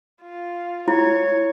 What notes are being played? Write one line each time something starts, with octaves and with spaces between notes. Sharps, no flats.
F4
E4 C#5